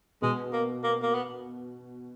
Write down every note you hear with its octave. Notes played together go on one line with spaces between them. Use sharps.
B2 G#3
A#3
A#3
A#3
B3